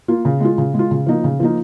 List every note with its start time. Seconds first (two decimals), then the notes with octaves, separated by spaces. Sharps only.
0.08 A#3 F4
0.25 C#3
0.40 G#3 F4
0.58 C#3
0.74 G#3
0.79 F4
0.91 C#3
1.06 F3 A#3 D#4
1.24 C#3
1.40 F3 A#3 D#4